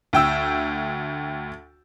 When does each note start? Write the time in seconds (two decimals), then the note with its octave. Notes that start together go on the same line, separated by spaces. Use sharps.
0.13 D2 G5 E6